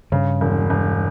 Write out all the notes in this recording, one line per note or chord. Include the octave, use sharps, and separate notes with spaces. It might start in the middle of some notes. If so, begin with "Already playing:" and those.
G2 C#3
E1
E1